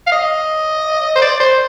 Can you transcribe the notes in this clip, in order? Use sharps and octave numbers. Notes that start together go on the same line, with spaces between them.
F5
D#5
C5
D5
C5